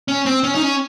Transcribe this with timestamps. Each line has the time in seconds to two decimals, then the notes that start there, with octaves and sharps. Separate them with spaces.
0.08 C#4
0.26 C4
0.44 C#4
0.55 D#4
0.62 C#4